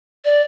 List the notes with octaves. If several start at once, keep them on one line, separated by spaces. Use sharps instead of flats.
D5